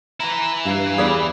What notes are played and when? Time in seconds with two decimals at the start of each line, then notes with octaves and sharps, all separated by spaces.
0.20 E3 E4 A#5
0.65 G2 F5
0.98 E2 G3 G#4